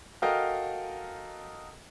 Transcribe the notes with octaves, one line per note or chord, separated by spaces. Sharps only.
F#4 A4 A#4 D#5 F5 G5